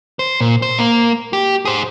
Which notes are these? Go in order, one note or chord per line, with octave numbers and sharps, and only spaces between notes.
C5
A#2
C5
A#3
G4
G#4 C5